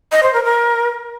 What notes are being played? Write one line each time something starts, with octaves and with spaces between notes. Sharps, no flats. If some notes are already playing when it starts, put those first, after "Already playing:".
D#5
C5
A#4
A#4